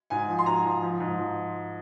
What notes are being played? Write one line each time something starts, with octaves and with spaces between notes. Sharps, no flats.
G#2 G#5
F3
C6
G#2 A#5
F3
F3
G#2
F3